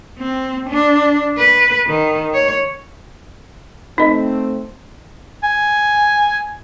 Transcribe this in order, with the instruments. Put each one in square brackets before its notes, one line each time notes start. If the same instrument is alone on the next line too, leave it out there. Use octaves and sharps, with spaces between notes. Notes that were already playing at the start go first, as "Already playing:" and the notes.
[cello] C4
D4
B4
D#3
C#5
[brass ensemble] A3 C4 [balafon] D#4 D#5
[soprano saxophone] G#5